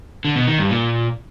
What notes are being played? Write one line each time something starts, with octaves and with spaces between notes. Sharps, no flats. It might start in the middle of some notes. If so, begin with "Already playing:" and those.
D3
B2
D#3
G2
A#2